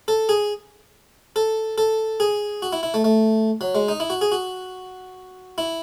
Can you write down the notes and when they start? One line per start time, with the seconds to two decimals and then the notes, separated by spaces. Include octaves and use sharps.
0.08 A4
0.29 G#4
1.36 A4
1.78 A4
2.20 G#4
2.62 F#4
2.73 E4
2.83 E4
2.94 A3
3.04 A3
3.61 F#3
3.75 G#3
3.89 D#4
4.00 E4
4.10 F#4
4.21 G#4
4.32 F#4
5.58 E4